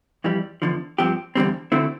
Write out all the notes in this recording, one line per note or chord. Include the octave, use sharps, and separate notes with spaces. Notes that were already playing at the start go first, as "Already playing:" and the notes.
F2 E3 G3
E2 D3 F3
G2 F3 C4 G4
E2 D3 G3 C4
D2 D3 A3 C4 E4